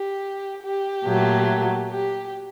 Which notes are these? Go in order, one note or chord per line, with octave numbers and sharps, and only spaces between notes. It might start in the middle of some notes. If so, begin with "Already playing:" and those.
Already playing: G4
G4
A#2 F#3 A3
G4